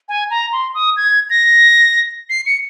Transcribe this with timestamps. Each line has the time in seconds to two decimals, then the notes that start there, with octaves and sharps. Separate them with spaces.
0.09 G#5
0.31 A#5
0.53 C6
0.74 D#6
0.97 G#6
1.30 A#6
2.30 C7
2.46 C#7